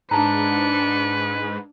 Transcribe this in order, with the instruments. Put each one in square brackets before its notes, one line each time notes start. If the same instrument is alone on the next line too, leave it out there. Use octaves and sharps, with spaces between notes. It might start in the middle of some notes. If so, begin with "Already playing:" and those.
[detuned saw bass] G#2 [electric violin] D4 C#7 [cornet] B4 [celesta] A5 A#5